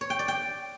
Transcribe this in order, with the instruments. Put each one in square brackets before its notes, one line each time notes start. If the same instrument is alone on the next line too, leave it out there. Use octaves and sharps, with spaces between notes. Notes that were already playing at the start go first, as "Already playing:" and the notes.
[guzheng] C#5
G5
D5
G5